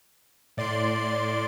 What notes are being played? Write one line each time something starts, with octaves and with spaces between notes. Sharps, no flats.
A2 D5 C6 D7